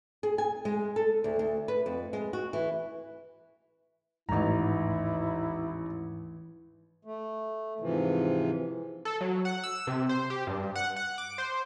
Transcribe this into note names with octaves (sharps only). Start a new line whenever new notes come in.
G#4
G#5
G#3
A4
D2
D2
B4
F2
G#3
F#4
E3
A1 D#2 G#2 E3 D#4 E4 A#5
A3
G#2 C3 E3 F3
A4
F#3
F#5
E6
C3
C5
G4
G2
F#5
F#5
D6
C5